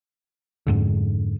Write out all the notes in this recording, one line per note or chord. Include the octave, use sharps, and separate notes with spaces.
F2 G#2 D3